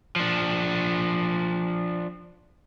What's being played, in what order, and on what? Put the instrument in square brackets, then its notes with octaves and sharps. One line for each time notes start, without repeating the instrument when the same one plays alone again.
[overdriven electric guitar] F3 D4